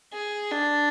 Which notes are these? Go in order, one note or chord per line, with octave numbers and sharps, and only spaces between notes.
G#4
D4